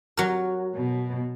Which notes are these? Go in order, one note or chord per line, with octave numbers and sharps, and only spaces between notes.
F#3 A#4
B2